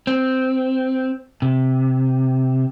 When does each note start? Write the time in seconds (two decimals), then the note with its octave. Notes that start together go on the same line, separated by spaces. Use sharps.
0.07 C4
1.42 C3